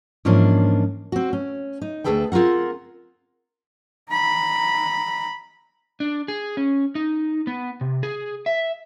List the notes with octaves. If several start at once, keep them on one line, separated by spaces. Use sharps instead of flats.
G#2 E3 F3 A#3 C#4 D4
C4 F#4
C#4
D#4
D2 G#2 G#4 A4 B4 G5
C4 F4 G#4 A#4 F#5
A#5 B5
D4
G#4
C#4
D#4
B3
C3
G#4
E5